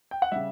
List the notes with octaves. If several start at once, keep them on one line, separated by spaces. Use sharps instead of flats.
G5
F#5
C#3 G3 E5